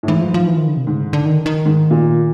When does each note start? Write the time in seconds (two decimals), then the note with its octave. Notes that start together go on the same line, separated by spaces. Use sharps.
0.03 A2
0.08 G#2 E3
0.21 F3
0.34 F3
0.47 E3
0.57 D#3
0.67 D3
0.77 C3
0.87 G#2 C#3
1.00 D3
1.13 D3
1.26 D#3
1.46 D#3
1.65 G#2
1.91 A#2